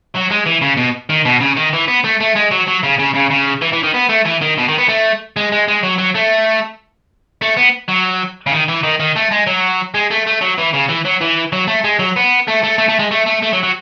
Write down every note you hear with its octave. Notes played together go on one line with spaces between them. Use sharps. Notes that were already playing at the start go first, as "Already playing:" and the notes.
F#3
G#3
E3
C#3
B2
D#3
B2
C#3
D#3
E3
B3
A3
A3
G#3
F#3
F#3
C#3
C#3
C#3
C#3
E3
E3
D#3
B3
A3
E3
D#3
B2
D#3
B3
A3
G#3
G#3
G#3
F#3
F#3
A3
A3
B3
F#3
C#3
D#3
E3
D#3
D#3
A3
G#3
F#3
G#3
A3
A3
F#3
E3
C#3
E3
F#3
E3
F#3
A3
G#3
F#3
B3
A3
A3
A3
A3
G#3
A3
A3
A3
F#3
F#3